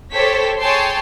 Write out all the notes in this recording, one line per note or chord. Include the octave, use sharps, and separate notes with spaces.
G4 A4 C5 C#5 B6
G#4 C#5 G5 A5 C6